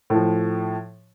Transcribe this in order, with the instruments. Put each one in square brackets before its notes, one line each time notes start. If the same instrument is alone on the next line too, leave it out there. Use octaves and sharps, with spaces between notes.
[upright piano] A2 F3